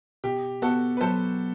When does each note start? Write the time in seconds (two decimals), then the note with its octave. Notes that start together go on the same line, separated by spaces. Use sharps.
0.24 B2 G4
0.62 B3 F#4 A4
0.97 B4
1.01 F#3 A4 C5